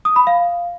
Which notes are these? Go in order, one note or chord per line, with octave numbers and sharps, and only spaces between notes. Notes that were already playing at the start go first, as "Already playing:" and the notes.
D#6
B5
F5